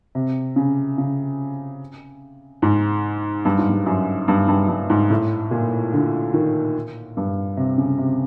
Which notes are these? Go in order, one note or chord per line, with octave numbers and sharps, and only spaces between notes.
C3
C#3
C#3
G#2
G2
G#2
G2
F#2
G2
G2
G2
G#2
A2
A#2
D3
D#3
G2
C3
C#3
C3